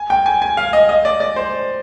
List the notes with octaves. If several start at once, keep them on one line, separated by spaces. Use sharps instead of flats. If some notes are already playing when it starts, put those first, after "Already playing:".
Already playing: G#5
G5
G#5
G#5
F5
D#5
D#5
D5
D5
C5